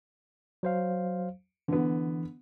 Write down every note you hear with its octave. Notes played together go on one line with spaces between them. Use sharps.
F#3 C5 F5
D3 E3 B3